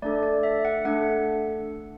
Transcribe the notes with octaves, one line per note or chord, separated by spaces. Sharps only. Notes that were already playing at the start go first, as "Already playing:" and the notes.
A3 D4 A4 D5
D5
E5
F#5
A3 D4 A4 F#5